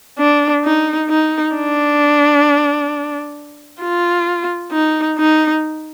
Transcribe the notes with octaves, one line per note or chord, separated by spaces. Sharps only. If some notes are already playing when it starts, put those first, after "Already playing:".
D4
D#4
D#4
D4
F4
D#4
D#4